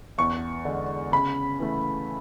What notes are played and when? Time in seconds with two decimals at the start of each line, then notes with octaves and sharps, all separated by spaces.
0.18 E2 C#6
0.65 D3 G#3
1.12 C#3 B5
1.59 E3 A3